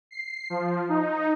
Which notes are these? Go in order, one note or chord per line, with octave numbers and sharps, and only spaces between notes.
C7
F3
D#4